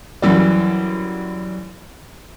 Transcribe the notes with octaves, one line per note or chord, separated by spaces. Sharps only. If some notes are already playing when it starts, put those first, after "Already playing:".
F#2 E3 G3